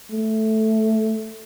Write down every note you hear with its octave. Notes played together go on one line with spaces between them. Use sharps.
A3